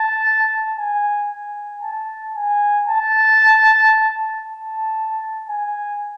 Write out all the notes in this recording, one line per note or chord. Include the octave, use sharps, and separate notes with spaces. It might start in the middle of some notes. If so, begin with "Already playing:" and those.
Already playing: A5
G#5
G#5
A5
G#5
A5
A5
G#5